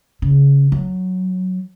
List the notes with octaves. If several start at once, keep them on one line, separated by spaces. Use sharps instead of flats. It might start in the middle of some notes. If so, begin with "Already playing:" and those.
C#3
F#3